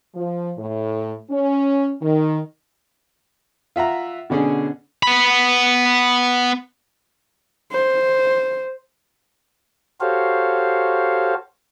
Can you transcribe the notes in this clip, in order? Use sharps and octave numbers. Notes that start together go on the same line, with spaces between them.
F3
A2
C#4
D#3
F4 E5 F#5 A#5
B2 D3 C#4 D4 G#4
B3 B5
C5
F#4 G4 A4 C5 C#5 F5